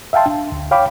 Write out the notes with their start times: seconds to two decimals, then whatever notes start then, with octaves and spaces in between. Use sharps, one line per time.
0.13 E5 F5 G5 A5 C6
0.26 D4
0.52 D2
0.71 C#5 F5 G5 B5 D6